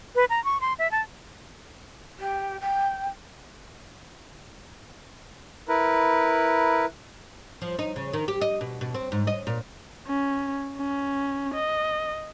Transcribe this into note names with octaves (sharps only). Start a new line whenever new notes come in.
B4
A#5
C#6
C6
E5
A5
G4
G5
E4 A#4 B4
F3
D#4
C#3
D#3
G4
D#5
B2
B2
C4
G#2
D#5
A#2
C#4
C#4
D#5